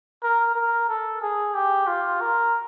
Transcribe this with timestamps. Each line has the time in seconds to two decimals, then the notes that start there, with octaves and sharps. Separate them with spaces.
0.23 A#4
0.55 A#4
0.89 A4
1.21 G#4
1.54 G4
1.87 F4
2.21 A#4